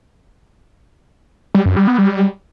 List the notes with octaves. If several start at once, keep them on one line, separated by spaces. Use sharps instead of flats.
G3
F#2
G3
B3
G3